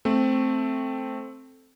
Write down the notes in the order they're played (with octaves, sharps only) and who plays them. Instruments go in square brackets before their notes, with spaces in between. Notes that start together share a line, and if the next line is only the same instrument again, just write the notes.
[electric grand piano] A3 C4